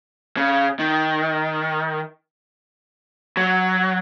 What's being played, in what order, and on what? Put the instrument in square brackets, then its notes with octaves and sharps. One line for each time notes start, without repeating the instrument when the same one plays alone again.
[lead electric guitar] C#3
D#3
F#3